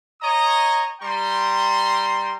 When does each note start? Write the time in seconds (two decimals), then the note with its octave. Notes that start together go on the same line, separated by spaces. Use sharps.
0.21 C#5 D#5 A#5 D#6
1.00 G3 G5 A#5 C6